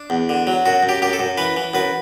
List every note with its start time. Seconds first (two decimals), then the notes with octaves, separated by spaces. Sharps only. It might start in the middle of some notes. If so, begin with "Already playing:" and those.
Already playing: D4
0.10 E2
0.29 D3
0.47 F#3
0.66 F#2 F#4
0.83 F#2
0.89 G4
1.02 F#2 G4
1.13 A4
1.19 F#2
1.38 E3 B4
1.56 E3
1.74 F#2 B4